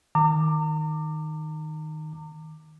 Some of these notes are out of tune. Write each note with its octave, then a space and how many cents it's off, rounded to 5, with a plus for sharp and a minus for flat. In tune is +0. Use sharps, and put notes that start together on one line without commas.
D#3 +0 A#5 -40 D6 +10